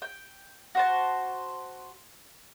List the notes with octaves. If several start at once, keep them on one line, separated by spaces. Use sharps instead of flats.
G5
F#4 C5 A5